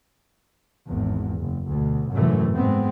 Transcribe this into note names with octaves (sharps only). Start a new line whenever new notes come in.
G#1 E2
F#1
D2 B2
G#1 F#2 A2 C3 E3 A3
G#2 G#3 B3 C4